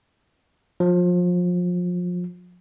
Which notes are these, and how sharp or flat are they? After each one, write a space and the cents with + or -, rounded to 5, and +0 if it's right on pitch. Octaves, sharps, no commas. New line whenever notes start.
F3 +30